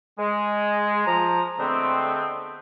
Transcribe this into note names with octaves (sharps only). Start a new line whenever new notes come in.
G#3
F3 A#5
D3 G#3 A3 B3 C4